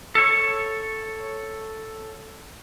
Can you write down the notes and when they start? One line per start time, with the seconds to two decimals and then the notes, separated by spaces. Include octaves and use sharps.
0.15 A4 C#5